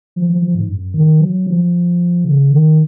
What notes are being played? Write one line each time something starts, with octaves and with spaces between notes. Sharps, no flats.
F3
F3
F3
G#2
F#2
D#3
F#3
F3
C#3
D#3